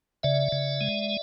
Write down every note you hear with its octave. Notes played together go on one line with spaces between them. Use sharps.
C#3 D5 E5
C#3
G#3